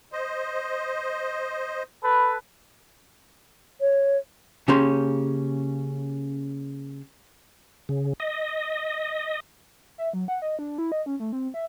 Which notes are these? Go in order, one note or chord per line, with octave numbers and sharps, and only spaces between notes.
C5 D#5
A4 B4
C#5
C#3 A#3 C#4 G4 C6
C#3
D#5
E5
F#3
F#5
D#5
D4
E4
D#5
C#4
A3
C4
E5